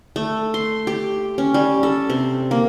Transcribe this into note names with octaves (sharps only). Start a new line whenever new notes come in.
A3
C6
G4
C#4
G3
A4
C3
A#3